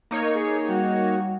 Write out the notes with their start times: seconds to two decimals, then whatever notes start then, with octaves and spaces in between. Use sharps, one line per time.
0.11 A#3 D#4 C#5
0.35 G#4
0.68 G3 F#4 F#5